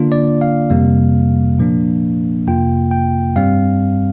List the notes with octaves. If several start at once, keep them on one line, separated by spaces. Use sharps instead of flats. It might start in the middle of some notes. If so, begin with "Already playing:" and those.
Already playing: D3 A#3 D4 F4
D5
F5
F2 C3 G3 A#3
A#2 F3 A#3 D4
F2 C3 A#3 F4 G5
G5
G2 G3 C4 F5